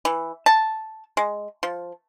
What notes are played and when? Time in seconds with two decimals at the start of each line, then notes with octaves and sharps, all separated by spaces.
0.05 E3
0.46 A5
1.17 G#3
1.63 F3